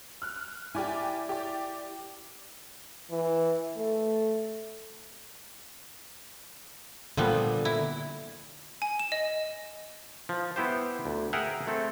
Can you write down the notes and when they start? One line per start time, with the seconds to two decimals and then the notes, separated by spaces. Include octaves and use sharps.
0.22 F6 F#6
0.75 E4 G4 D5 G#5
1.29 G4 D5
3.11 E3
3.77 A3
7.17 A#2 D3 F3 G3 B3
7.65 E4
8.82 G#5
9.00 E7
9.12 D#5
10.29 F3
10.56 B3 E4 G4 C5
11.05 D2
11.33 G#4 A#4 E5 F#5 G5 A#5
11.67 A3 C4 A4